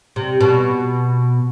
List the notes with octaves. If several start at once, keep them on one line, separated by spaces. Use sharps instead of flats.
C3
B2